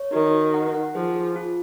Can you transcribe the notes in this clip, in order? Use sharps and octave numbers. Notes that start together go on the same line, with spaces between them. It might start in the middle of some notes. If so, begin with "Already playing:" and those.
Already playing: C#5
D#3 F#4
F#4
F#5
F#5
F3 G#4
G#4
F4